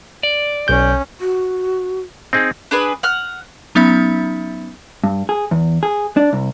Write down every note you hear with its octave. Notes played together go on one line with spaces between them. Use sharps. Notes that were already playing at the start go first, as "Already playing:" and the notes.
D5
B1 C#4 G6
F#4
C4 D#4 G#4
D4 G#4 B4
F#5 F6
F#3 B3 C#4 D#4 E5 B5
G2
G#4
E2
G#4
D4
C2